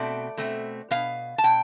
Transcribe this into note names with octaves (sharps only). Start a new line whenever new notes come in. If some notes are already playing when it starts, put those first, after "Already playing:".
Already playing: B2 A3 C4 D5
B2 A3 C4
B2 B3 F5
A5
B2 G5